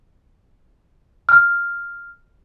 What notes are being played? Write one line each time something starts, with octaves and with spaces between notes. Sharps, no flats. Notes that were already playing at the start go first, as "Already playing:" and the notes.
F6